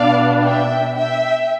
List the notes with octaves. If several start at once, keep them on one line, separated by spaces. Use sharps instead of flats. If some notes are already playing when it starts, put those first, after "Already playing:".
Already playing: B2 B3 D4 D5 F5
E5 G5
E5 G5